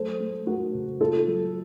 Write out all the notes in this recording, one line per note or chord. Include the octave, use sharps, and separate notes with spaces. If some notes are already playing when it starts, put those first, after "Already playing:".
Already playing: F#3 A3 A4 C5
A3
A3 F#4 A#4
C#3
A#3 F4 A4
F#3